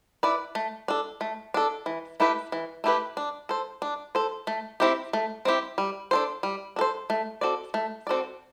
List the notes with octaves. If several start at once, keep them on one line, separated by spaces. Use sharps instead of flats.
E4 B4 D5
A3
D4 A4
A3
D4 A4
E3
A3 E4 G4 B4
E3
A3 E4 G4 B4
D4
A4 C5
D4
A4 C5
A3
C4 E4 G4
A3
C4 E4 G4
G3
D4 A4 C5
G3
D4 A4 C5
A3
C4 F#4 A4 D5
A3
C4 F#4 A4 D5